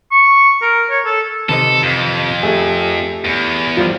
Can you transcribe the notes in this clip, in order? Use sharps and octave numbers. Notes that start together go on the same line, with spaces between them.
C#6
A#4
C#5
A4
C3 D#3 A4 B4 D#5
F2
A3 G4 G#4 G#5
E2
F3 G3 F4 A#4